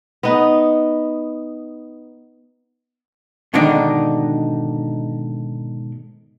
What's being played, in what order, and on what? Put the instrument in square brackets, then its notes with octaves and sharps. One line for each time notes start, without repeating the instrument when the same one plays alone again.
[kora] B3 D#4
[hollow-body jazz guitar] G#2 B2 D3 D#3 D4 D#4